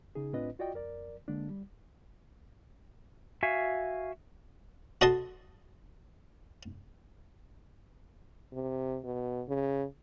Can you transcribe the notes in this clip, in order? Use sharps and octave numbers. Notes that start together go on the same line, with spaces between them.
C#3 D#4 G#4
A2 C4 D4 F4 B4 D#5
F4 F#4 D5 D#5 G5
F2 A#4 D5
D3 G#3 A#3 D4
G3
F#4 E5 F5 G#5
F#4 A4 D#5 A5 C6
C3
B2
C#3